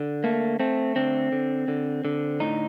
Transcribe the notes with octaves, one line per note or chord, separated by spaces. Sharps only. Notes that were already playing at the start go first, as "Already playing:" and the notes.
Already playing: D3
A3 A#3
A3 C4
D3 C4
D3
D3
D3
A2 D#4